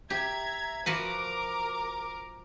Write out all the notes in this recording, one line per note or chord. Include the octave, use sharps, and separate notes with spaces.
G4 E5 A#5 G#6
F3 F#4 A#4 B4 D6